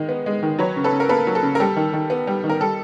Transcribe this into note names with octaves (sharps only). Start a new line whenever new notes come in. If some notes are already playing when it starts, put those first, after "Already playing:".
Already playing: D#3 G#3
B3
G#3
D#3
F#3 B4 C#5
C#3
A4 B4
C#3
A#4
A#3 A4 B4
F#3
A4
C#3
A#4
G3 A4
D#3
D#3
B3
G3
D#3
A#4
G3 A4